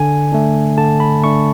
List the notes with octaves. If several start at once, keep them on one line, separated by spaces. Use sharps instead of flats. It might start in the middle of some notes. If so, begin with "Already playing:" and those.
Already playing: D3 G#5
A3 D4
D3 A5
B5
A3 D4 C#6